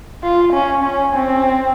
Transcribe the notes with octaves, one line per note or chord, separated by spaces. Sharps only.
F4
C#4
C#4
C4